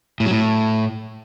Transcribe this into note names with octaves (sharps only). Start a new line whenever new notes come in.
A2
F#3
A2